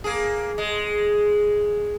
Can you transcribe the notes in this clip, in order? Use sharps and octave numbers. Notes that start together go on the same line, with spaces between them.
A#3 G#4
G#3